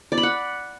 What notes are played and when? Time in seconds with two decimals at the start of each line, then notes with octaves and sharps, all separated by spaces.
0.12 D5
0.18 B5
0.23 F#5